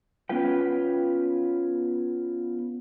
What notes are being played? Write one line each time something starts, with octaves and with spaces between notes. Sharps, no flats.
B3 C#4 F4 B4 G5